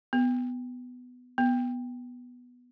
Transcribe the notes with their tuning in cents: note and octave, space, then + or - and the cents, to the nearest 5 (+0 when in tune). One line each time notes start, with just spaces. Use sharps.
B3 +10
B3 -5